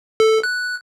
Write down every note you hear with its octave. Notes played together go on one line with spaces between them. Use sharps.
A4
F#6